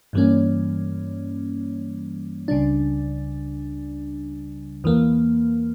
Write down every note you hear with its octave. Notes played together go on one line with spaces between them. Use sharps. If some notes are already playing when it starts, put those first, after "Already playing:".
G2 E3 G3 A#3 C#4
C#2 C#3 G3 D4
E2 E3 A#3